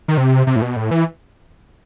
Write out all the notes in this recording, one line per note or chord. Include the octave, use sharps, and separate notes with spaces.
D#3
C3
C3
A2
B2
A2
E3